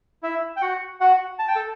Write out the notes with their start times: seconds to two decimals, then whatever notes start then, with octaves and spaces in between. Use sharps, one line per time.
0.23 E4 E5
0.57 G5
0.62 F#4 F#5
1.01 F#4 F#5
1.39 A5
1.48 G5
1.55 A4 A5